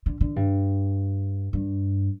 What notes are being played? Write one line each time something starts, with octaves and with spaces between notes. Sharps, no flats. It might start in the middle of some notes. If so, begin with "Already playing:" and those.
D3
D3
G2
G2